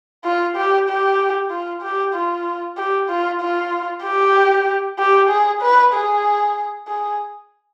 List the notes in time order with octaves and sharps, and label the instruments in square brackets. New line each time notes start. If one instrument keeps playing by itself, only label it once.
[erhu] F4
G4
G4
F4
G4
F4
G4
F4
F4
G4
G4
G#4
B4
G#4
G#4